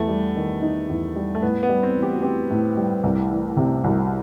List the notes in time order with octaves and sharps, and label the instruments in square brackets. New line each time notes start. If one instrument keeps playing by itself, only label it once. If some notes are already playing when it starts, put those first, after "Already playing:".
Already playing: [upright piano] E2 [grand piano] A3
[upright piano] G3
D#3
D#4
E2
G3
[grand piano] A3
[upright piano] A2 [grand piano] B3
[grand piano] B3
[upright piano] G3
[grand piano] C4
[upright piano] E3
[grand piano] G4
F#4
[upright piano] C4 [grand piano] G4
[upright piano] A2
G3
C2
E3
C3
[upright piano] C2 [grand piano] F#4